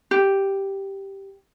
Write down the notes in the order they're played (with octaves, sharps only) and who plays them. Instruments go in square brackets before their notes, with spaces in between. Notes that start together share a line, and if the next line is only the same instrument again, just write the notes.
[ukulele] G4